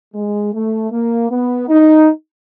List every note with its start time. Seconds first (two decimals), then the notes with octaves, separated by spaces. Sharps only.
0.15 G#3
0.54 A3
0.91 A#3
1.30 B3
1.69 D#4